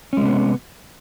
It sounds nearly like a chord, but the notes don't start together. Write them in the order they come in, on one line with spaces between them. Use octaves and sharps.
C#4 G#3 C3 B3